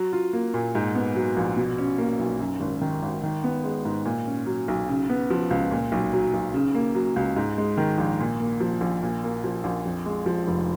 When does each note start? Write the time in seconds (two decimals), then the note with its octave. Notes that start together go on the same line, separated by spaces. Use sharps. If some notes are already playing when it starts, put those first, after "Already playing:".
Already playing: F#3
0.13 F4
0.33 A#3
0.54 A#2
0.75 G#2
0.95 B3
1.15 F#3
1.37 A#1
1.57 B2
1.78 C#4
1.98 A#3
2.19 B1
2.40 F#2
2.60 G#1
2.81 D#3
3.02 G#1
3.23 D#3
3.44 B3
3.64 G#3
3.85 G#2
4.05 A#2
4.26 C#4
4.46 F#3
4.68 B1
4.88 C#3
5.09 B3
5.30 F3
5.51 C#2
5.71 A#2
5.92 B1
6.13 F#3
6.34 B1
6.54 C#3
6.75 A#3
6.95 F#3
7.16 C#2
7.36 G#2
7.58 G#3
7.78 D#3
7.98 A#1
8.20 A#2
8.40 A#3
8.60 F3
8.81 A#1
9.03 A#2
9.24 A#3
9.44 F3
9.64 A#1
9.86 F2
10.06 G#3
10.26 F3
10.47 F1